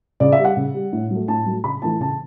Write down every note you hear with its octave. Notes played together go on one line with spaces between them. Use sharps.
C#3 D5
E5
G3
F#5
C#3
G3
A2
F#3 A3
A2 A5
F#3 A3
C#3 B5
E3 A3 A5
C#3 A5